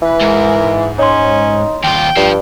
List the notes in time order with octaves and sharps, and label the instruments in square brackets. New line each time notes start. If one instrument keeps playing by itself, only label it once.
[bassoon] E3 [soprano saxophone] B4
[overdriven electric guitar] G#2 [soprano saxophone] A#4
[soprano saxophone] C#4 [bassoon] D#4 [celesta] C#5 C6
[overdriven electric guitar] D#2 F4 [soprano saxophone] G5
[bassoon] G2 [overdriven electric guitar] F3 [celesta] D5